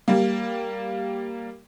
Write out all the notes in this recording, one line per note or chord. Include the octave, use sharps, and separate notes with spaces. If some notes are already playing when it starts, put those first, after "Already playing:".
G3 A#3